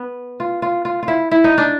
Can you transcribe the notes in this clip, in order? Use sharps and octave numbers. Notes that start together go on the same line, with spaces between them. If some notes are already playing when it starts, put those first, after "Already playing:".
Already playing: B3
F4
F4
F4
F4
E4
E4
D#4
D4